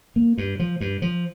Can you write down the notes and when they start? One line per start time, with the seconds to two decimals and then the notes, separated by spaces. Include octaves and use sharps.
0.16 A#3
0.38 G2
0.59 F3
0.81 G2
1.02 F3